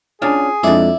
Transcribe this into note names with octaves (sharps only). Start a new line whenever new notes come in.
C#4 D4 F4 G#4
F2 G#3 D4 E4 D5